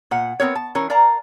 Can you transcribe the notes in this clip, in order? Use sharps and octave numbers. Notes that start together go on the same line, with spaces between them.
A#2 F#5
B3 C4 A#4 C#5
A5
E3 C#4 A#4
A#4 D5 F5 A5 A#5